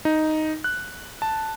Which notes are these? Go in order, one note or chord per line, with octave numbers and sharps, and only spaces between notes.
D#4
F#6
A5